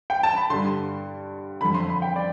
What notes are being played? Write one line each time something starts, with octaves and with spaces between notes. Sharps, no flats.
G5
A5
B5
G2 D3 C6
F2 D3 B5
C6
B5
G5
D5